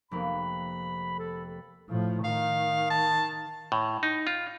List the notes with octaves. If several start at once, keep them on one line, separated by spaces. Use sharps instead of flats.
F1 A#3 B3 B5
A4
A2 F3
D#3 F5
A5
A2
D#4
F4